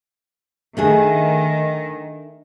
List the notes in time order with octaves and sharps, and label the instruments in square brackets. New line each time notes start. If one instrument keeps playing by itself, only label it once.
[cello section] D#3 [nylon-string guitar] A3 D4 G#4